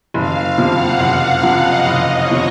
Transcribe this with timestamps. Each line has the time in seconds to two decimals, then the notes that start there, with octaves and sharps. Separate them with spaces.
0.14 F#1 F5
0.42 F5
0.58 F2 C3 F3
0.71 F#5
1.00 F#1 F#5
1.29 F5
1.43 F2 C3 F3
1.58 D#5
1.86 F#1 D#5
2.15 C#5
2.31 C3 F3